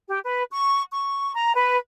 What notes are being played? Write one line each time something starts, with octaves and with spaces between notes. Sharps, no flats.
G4
B4
C#6
C#6
A#5
B4